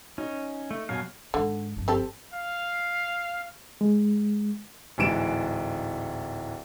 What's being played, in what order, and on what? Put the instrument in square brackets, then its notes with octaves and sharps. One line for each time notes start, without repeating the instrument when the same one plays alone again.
[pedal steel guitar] C#4 [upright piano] D#4
[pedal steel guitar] A3
[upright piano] F#2 B2 [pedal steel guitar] F5 G#5
[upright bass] G#2 D#3 [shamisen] D3
[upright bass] G1 F2
[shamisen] C4 G4 A4
[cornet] F5
[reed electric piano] G#3
[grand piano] D1 G#2 E3 D7 E7